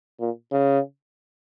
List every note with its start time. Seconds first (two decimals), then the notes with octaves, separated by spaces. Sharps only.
0.21 A#2
0.51 C#3